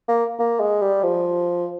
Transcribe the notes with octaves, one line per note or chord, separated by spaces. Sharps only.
A#3
A#3
G#3
G3
F3